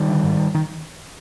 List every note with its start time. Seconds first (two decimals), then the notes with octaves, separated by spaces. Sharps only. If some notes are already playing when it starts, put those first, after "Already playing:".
Already playing: D#3 G3
0.09 D3
0.23 G#2
0.54 D#3